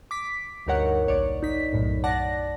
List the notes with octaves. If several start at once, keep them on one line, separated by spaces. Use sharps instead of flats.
D6 B6
D2 G2 D#4 A#4 C#5 F#5
A#1 C#5 D5
D#4 B6
B1 F#2 A2
D5 F#5 A5 A#6